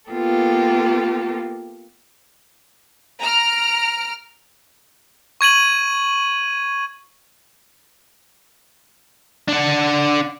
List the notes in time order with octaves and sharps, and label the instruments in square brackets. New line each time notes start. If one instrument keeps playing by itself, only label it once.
[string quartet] A#3 B3 F4 G4 A4
[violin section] A#5 F6 D7
[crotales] C#6 G#6 D#7 F#7
[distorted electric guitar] D4 F#5